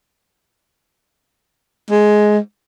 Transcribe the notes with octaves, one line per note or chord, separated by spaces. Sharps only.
G#3